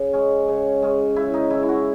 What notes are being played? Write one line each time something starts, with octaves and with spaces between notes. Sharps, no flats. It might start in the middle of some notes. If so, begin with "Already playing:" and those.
Already playing: C#3
G#3 C#4
C#3
G#3 C#4
C#3 E4
D#4
G#3 C#4 E4
E4
F#4